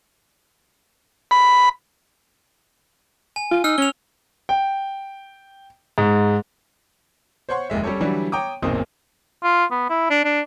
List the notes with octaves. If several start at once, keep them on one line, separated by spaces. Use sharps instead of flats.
B5
G#5
F4
D#4 E6 F6
C#4 F7 G7
G5
G#2
C5 C#5 F#5 C6 C#6
F1 D#2 G#3 E5
G3 C#4 G4 A4 C#5
D3 E3 F#3 G3 D4 E4
C#5 G5 A#5 D6 D#6
F#1 B1 A#2 D#3 C4 D#6
F4
B3
E4
D4
D4